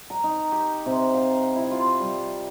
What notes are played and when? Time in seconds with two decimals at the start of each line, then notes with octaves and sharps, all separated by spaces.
0.10 A#5
0.24 D#4
0.52 G4
0.86 C3
1.14 F5
1.56 E4
1.71 F4
2.00 G3